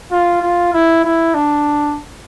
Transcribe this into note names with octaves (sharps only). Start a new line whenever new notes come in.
F4
F4
E4
E4
D4